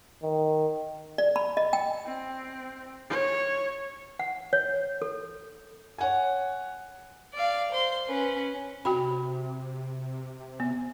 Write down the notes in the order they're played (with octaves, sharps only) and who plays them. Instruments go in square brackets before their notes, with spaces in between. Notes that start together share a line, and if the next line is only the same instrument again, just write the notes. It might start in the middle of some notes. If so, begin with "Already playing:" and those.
[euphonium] D#3
[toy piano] D5
B5
D#5
G5
[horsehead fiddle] C4
C#5
[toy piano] F#5
C#5
A4
[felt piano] C#5 F#5 G#5
[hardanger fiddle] D5 F5
C5 C6
C#4 B4
[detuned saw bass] C3 [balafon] F#4 G5 B5
[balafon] B3